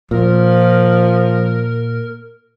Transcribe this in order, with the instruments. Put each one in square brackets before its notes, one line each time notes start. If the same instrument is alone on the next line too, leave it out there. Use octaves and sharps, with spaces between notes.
[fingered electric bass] A#2 [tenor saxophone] F3 [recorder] A#4